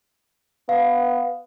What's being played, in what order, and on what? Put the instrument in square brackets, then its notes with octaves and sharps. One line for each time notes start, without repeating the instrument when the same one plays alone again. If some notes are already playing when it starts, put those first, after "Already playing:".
[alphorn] B3 [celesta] F5